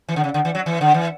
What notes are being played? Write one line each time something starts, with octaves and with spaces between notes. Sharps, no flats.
E3
D3
C#3
D3
E3
F#3
E3
D3
E3